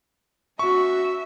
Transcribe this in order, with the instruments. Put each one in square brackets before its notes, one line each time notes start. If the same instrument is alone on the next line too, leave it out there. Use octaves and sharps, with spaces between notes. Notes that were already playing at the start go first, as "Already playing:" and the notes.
[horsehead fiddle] C#4 F#4 [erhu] E5 [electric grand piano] C#6